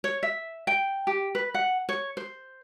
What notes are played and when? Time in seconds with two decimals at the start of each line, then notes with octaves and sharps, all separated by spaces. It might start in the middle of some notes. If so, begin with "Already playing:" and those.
0.04 C#5
0.23 E5
0.67 G5
1.07 G4
1.35 B4
1.54 F#5
1.89 C#5
2.17 C5